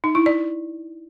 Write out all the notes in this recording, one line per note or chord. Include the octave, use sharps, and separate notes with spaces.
D#4
E4
D5